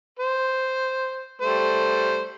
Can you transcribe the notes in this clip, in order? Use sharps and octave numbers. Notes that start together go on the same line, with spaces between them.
C5
G3 A3 C5